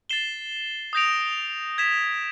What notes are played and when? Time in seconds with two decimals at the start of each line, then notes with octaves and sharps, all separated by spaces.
0.10 A6 C7 E7 G7
0.93 D#6 G6 A#6 D7 F7
1.78 G#6 B6 E7